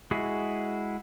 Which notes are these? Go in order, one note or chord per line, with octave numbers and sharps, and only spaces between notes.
G#3 E4 F#4 G#4